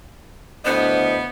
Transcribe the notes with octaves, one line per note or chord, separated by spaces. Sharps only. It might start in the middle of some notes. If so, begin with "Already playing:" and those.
D2 A2 B3 C5 D#5